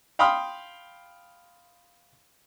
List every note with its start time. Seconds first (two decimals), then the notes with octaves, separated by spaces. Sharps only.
0.19 F5 G5 B5 C6 D#6 F6